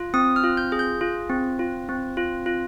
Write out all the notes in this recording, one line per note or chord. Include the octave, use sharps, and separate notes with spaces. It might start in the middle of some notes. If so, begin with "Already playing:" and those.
Already playing: F4
C4 D#6
F6
F4
G6
G#4
G6
F4
C4
F4
C4
F4
F4